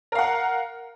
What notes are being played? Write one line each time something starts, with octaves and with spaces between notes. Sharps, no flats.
A#4 F5 F#5